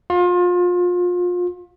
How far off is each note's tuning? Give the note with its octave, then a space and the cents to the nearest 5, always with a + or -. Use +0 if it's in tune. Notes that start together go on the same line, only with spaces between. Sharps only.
F4 +30